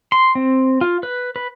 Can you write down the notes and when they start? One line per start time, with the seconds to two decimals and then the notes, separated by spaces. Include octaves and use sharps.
0.12 C6
0.35 C4
0.81 F4
1.03 B4
1.36 B4